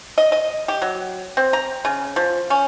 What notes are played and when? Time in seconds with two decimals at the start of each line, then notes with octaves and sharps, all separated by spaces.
0.18 D#5
0.32 D#5
0.68 G4
0.82 F#3
1.37 C4
1.53 A#5
1.85 C#3
2.16 F3
2.50 C#4